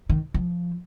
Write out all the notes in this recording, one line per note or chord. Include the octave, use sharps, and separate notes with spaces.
D#3
F3